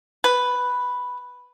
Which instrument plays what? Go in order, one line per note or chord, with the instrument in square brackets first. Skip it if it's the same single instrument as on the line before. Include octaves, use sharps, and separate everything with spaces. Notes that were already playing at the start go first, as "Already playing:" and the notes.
[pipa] B4